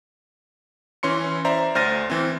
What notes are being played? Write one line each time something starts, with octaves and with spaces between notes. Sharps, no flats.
E3 C#4 C6 C#7
C5 D5 E5 A#5
D2 C5 F6 A6 A#6 D#7
E3 C4